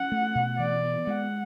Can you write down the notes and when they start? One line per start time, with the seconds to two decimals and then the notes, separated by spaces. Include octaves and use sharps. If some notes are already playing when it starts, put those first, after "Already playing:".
Already playing: C#4 F#5
0.12 A3
0.35 B2
0.59 E3 D5
0.83 B3
1.07 G#3 F#5